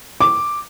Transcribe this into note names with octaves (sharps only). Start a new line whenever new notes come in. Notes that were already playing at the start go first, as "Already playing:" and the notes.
D6